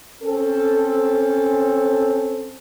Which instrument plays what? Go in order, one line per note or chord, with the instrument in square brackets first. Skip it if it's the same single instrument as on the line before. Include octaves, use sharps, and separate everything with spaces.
[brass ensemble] C4 C#4 A4